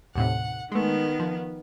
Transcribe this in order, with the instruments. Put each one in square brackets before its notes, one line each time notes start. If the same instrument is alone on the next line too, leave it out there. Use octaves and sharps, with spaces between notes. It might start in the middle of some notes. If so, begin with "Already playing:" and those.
[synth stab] D#2 A2 C3 [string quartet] F#5
[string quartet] D#3 B3 [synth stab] G#3 A3
[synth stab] F3